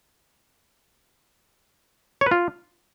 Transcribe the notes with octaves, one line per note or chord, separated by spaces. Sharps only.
C#5
B4
F4